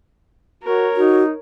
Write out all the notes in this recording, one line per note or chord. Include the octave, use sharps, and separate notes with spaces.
F#4 A#4 C#5
D#4 F#4